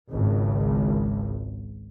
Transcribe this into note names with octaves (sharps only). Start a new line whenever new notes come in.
G#1 C#2